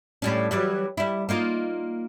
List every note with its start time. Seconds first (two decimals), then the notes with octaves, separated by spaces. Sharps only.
0.22 A2 G3 C#4
0.51 E3 F#3 G3
0.97 G3 E4
1.29 A#3 D#4 F4